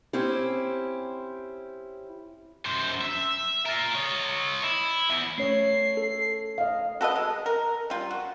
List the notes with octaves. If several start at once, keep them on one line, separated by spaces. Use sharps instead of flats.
C4 C#4 E4 G4
F#2 C5
E5
F4 A#4
C#5 D#5
E4
E3 B3
A3 C#4 C#5 C7
A4
D#5 F5
F#4 A4 B4 D#5
G#3
A#4
G3 F4
F#4